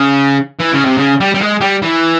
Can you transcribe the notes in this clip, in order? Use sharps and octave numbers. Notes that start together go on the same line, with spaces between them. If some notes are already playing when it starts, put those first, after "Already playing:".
Already playing: C#3
E3
C#3
C3
C#3
G3
G3
G#3
G3
E3